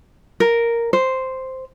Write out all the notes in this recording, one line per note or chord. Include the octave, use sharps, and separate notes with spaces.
A#4
C5